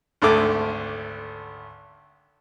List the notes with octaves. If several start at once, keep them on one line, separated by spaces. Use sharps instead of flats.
G#1 D2 D3 A3 D6